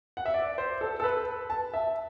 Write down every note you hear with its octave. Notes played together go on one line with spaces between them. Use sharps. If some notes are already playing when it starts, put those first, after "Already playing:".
F#5
E5
D5
C5
A4
A4
B4
A5
E5